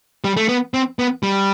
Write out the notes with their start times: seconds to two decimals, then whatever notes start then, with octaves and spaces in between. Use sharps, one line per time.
0.24 G3
0.37 A3
0.49 B3
0.74 C4
0.99 B3
1.23 G3